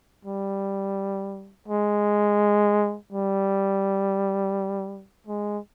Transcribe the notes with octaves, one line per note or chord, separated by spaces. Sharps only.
G3
G#3
G3
G#3